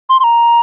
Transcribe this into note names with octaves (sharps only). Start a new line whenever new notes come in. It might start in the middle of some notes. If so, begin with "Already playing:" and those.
C6
C6
A#5